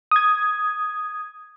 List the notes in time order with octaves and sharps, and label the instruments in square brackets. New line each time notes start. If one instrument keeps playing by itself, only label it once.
[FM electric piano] D#6 G#6